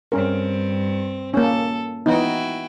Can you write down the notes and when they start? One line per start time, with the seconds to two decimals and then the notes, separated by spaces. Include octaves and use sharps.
0.12 G2 C4 C#4 A#4
1.34 A#3 C#4 A4
2.06 E3 B3 D#4 E4 F#4 G5